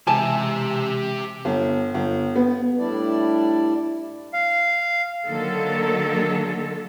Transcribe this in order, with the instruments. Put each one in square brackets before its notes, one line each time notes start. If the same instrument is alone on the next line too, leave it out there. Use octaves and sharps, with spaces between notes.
[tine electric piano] C3 E3 G#3 [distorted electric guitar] G4 E5 [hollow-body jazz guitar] G#5 A5
[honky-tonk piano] G1
G1
B3
[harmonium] A2 G3 D4 E4 D5
[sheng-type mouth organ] F5
[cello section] D3 D#3 F#3 A#3 A4